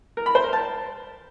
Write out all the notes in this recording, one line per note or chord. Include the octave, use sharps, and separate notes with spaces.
A#4
B5
C5
A#4
A5